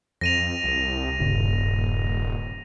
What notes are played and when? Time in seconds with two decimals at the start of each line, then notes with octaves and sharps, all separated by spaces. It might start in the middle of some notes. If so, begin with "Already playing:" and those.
0.21 F2 A#6 D#7 F7
0.64 C2
1.19 D#1 G#1 G2 C#3